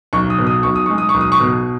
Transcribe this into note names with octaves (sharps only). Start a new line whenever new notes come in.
B1 C#6
D#6
B2
D#6
B1 C#6
D#6
G#3 C#6
D#6
C#6
B1
D#6
C#6
B2